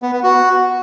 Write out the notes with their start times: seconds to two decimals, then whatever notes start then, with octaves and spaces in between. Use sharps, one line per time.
0.02 B3
0.13 B3
0.23 F#4